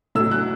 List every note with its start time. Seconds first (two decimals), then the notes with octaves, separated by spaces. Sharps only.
0.15 A2 F#3 E6
0.31 F#6